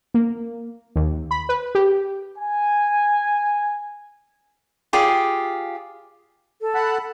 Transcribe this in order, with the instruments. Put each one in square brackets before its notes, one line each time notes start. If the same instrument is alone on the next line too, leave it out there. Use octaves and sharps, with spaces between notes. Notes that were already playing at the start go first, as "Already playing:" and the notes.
[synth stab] A#3
D#2
B5
B4
G4
[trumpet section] G#5
[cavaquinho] F4 G4 G#4 D5
[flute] A4
[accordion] F#5 A5 B5